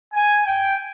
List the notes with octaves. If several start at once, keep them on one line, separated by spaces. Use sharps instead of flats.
G#5
G5